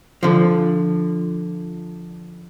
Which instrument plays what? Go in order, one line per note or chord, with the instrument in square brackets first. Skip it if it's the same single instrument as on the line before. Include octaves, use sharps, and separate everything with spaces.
[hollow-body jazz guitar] D3 F3